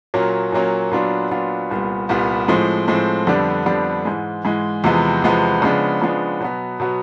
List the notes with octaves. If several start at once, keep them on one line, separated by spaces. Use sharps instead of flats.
A#2 F#3 A#3 C#4
A#2 F#3 A#3 C#4
A#2 F#3 B3 D4 F4
A#2 F#3 B3 D4 F4
C2 A#2 G3 B3
C2 A#2 G3 B3
A2 F3 G#3 C4
A2 F3 G#3 C4
F2 D3 G3 B3 D4
F2 D3 G3 B3 D4
G#2 E3 G#3
G#2 E3 G#3
E2 C3 F3 G#3 B3
E2 C3 F3 G#3 B3
C#3 F3 G#3 B3 D4
C#3 F3 G#3 B3 D4
B2 F#3 B3
B2 F#3 B3